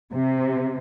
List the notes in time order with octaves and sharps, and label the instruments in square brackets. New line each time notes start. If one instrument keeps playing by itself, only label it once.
[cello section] C3